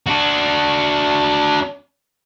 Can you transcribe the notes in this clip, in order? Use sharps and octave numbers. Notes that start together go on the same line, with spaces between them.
D4 F#4